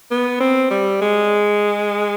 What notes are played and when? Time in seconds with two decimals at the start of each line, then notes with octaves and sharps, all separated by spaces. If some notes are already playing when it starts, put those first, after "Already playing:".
0.11 B3
0.40 C4
0.70 G3
1.01 G#3